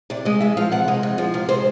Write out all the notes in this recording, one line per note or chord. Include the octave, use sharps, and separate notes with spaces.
C3 D5
G#3 D#5
F2 E5
F3 F5
C3 F#5
G#3
F2
F3
C3 F5
G#3 C5